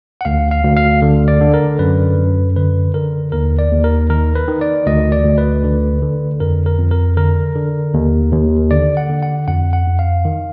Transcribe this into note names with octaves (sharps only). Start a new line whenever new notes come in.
F#5
D2 F5
F5
D2
F5
D3
D5
D3
A#4
F#2 B4
F#2
D3 B4
D3 A#4
D#2 A#4
D5
D#2
A#4
D#3 A#4
B4
D#3
D5
D2 D#5
D5
D2
B4
D3
D3
F2 A#4
A#4
F2
A#4
D3 A#4
D3
D#2
D#2
D3 D5
F#5
D3
F#5
F2 F#5
F#5
F2
F5
D#3